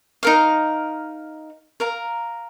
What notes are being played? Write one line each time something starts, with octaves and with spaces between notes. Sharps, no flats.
D#4 A#4 F5
A#4 F5 A#5